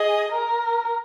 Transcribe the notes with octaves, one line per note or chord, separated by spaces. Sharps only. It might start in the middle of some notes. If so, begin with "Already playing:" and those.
Already playing: G#4 D#5
A#4